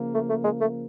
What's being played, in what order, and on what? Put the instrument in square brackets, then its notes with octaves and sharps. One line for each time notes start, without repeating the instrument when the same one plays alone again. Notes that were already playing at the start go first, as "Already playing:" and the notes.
Already playing: [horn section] C#3 F3 A#3
[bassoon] A3
A3
G#3
A3